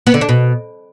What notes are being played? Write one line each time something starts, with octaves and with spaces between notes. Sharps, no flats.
B3
D3
D4
B2